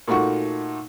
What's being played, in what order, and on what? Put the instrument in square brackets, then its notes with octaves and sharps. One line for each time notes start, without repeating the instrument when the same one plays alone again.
[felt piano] A#2 A3 D#4 F#4 C#6